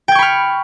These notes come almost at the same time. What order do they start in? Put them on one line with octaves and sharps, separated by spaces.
G5 G#6 C#6 B5 F6